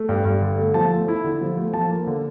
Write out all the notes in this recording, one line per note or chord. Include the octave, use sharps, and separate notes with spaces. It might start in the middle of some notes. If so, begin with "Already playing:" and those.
Already playing: A3
G2
G2
D3
A3
F3 A5
A3
E4
D3
F3
A3
F3 A5
A#3
D3